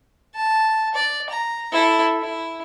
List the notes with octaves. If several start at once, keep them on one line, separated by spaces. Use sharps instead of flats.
A5
D5
A#5
E4 A4
E4